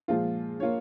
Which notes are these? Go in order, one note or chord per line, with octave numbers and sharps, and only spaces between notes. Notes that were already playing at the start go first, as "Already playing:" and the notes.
A#2 F3 G#3 F4
A#3 F4 C#5